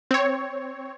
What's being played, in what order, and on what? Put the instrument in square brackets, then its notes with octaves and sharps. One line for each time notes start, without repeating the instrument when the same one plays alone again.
[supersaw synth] C4 C#5